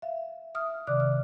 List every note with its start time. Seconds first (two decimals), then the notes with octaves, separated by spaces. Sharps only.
0.02 E5 F5
0.55 E5 D#6 F6
0.87 C3 D#3 D5 D6 F#6
1.00 F6